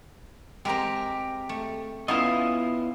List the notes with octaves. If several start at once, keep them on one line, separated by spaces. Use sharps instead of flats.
G#3 C4 G4 A#4 A#5
A3
B3 C#4 E4 F4 D#5 F5 D#6